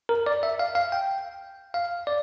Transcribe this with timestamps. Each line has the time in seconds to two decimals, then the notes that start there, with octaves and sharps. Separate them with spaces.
0.09 A#4
0.26 D5
0.43 E5
0.59 F5
0.75 F5
0.92 G5
1.74 F5
2.07 D5